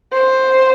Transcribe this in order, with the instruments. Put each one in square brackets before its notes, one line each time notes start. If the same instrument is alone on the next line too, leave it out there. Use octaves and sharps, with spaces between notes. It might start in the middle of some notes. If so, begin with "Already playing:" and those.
[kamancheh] C5